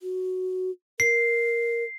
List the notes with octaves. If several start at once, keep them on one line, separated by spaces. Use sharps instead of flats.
F#4
A#4 C7